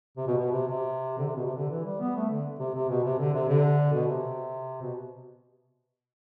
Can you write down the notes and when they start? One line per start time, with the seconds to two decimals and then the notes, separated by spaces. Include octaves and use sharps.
0.17 C3
0.27 B2
0.37 B2
0.52 C3
0.67 C3
1.18 D3
1.26 C3
1.36 B2
1.46 C3
1.56 D3
1.70 E3
1.85 G3
2.00 B3
2.15 A3
2.29 D3
2.59 C3
2.74 C3
2.89 B2
3.04 C3
3.18 D3
3.33 C3
3.48 D3
3.93 B2
4.07 C3
4.81 B2